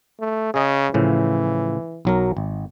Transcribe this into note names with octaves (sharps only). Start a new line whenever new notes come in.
A3
C#3 G#4 D#5
A2 C#3 E3 F3
B1 F#3 A#4
G#1